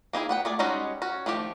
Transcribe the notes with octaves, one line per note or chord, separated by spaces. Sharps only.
A#3 D#4 E4 G#4
B3 F#5 G5
A3 G#4 D5
G3 G#3 C#4 D#4 F#4
C#4 F#4
D#3 F3 A3 G4